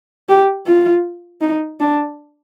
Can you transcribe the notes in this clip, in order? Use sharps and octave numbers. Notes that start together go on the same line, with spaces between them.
G4
F4
D#4
D4